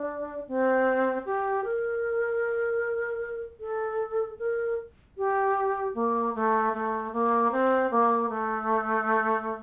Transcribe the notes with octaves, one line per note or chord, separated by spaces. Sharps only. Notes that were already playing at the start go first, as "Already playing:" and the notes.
Already playing: D4
C4
G4
A#4
A4
A#4
G4
A#3
A3
A3
A#3
C4
A#3
A3